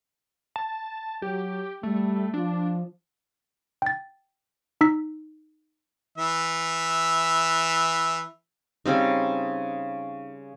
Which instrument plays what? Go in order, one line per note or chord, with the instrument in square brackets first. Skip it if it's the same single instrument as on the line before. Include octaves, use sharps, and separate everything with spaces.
[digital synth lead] A5
[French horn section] F#3 [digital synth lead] G4
[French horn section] G3 [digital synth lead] A3
[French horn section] F3 [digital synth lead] D4
[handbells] G5 A6
D#4 E6 B6
[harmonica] E3 E5
[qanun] C#3 G3 C4 D#4